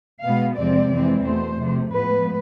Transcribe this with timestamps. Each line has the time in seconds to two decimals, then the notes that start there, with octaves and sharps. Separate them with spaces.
0.22 B2 G#3 B3 F5
0.56 E2 C3 F3 G#3 C4 D5
0.90 F2 E3 G#3 C4
1.23 E2 B2 A3 C5
1.57 C3 F3 A3
1.90 A2 F3 G#3 B3 B4